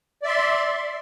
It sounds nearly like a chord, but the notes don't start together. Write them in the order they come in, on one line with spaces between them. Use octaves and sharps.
D5 E5 C6